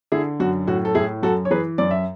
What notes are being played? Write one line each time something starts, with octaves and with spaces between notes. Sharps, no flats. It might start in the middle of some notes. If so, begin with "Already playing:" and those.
D3 E4 G#4
F#2 F#4
A2 F#4
A4
A2 E4 G#4
F#2 F#4 A4
C#5
E3 G#4 B4
F#2 D5
E5